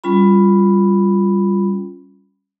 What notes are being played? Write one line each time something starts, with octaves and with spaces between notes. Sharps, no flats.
G3 C#4 F4 B5